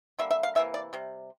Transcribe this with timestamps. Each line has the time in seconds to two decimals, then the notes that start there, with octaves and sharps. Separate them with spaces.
0.19 D3 G3 A#3 E5
0.31 E5
0.43 F5
0.55 C3 E3 A#3 E5
0.74 D5
0.93 C3 G3